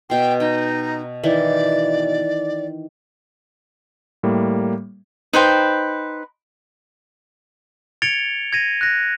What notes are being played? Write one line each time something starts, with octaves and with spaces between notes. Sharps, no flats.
B2 G5 C6
D#4 G5
D#3 E3 D5
A2 G3 A#3
D#4 B4 C5 G5
G#6 A6 C#7 D7 F7 G7
G#6 A#6 D#7
F#6 A#6